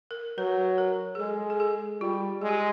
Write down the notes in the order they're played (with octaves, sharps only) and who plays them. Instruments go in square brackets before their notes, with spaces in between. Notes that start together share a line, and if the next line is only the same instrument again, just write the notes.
[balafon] A#4
[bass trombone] F#3 [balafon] B4
[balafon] A#4
G#4
[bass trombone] G#3 [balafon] A4
[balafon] A4
G#4
[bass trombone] G3 [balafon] F4
[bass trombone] G#3 [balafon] G#4
[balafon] G4